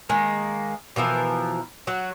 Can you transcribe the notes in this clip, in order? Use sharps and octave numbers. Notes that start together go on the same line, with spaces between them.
D#3 G#3 A#3
B2 E3 F3 A#4
F#3 F#4